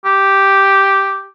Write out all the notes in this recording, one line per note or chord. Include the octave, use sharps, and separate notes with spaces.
G4